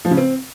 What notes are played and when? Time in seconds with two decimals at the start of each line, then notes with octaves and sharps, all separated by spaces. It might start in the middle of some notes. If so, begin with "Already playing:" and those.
0.05 F3
0.11 C#3
0.17 C4